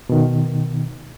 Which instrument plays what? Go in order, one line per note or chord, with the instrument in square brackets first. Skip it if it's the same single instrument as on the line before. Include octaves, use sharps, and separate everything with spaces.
[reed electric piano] B2 D#3